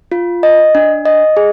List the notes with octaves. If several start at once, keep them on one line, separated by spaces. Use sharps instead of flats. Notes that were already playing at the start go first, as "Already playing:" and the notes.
F4
D#5
D4
D#5
G#4